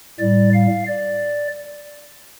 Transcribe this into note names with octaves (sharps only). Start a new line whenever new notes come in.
A2 G3 D5
F5
D5